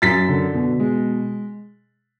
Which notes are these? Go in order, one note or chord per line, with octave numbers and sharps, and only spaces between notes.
F#2 A6 B6
D3
B2
G#3